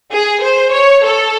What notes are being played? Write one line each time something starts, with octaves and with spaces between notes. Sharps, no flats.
G#4
C5
C#5
A4